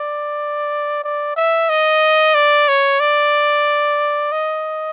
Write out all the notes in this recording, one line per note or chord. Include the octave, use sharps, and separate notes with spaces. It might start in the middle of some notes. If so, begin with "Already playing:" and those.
Already playing: D5
D5
E5
D#5
D5
C#5
D5
D#5